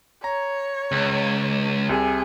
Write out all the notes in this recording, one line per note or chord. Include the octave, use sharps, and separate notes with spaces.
C#5 A#5
C#2
C2 C3 G#4